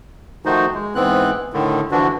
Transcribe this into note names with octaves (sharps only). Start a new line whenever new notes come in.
D#3 F3 A3 D#4 F#4 C5
G#3
G#2 E3 B3 C4 F#6
A2 D3 D#3
G2 D3 E3 F3 D4 F#4